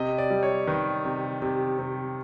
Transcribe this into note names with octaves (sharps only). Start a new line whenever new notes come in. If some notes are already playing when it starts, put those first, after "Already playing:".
Already playing: C3 D#5
D5
G3
C#5
D#3 B4
C3
C3
C3